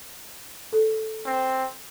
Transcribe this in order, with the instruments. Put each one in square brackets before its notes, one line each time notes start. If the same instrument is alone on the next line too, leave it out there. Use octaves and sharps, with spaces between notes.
[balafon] A4
[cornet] C4